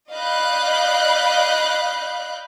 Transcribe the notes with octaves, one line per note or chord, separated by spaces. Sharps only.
D5 D#5 F5 B5 F#6 G6